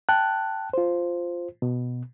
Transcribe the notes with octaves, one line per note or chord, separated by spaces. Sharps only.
G5 A5 F#6
F4 C5
B2